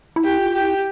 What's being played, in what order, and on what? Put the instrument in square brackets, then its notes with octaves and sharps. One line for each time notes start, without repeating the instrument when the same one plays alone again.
[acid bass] E4
[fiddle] G4
[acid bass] F4
[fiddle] G4
[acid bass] E4